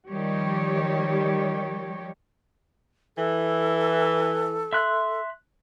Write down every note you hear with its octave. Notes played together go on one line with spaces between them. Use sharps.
D#3 F3 G3 G4 C#5
E3 A4
E5 C6 F#6